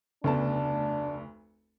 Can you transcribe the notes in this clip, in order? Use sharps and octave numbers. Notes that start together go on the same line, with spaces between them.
F1 D2 C#3 A3 B3 D4 A5